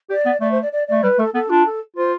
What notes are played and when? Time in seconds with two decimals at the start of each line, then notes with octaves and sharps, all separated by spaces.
0.10 G4 D5
0.25 B3
0.40 A3 D5
0.51 C5
0.61 D5
0.72 D5
0.87 A3 D5
1.03 G3 B4
1.18 A3 A4
1.33 B3 A4
1.49 D4 F4
1.65 A4
1.96 F4 C5